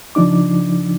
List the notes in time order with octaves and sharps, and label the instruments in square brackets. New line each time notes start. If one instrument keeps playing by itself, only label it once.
[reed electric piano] C#3 F3 D4 D#4 D6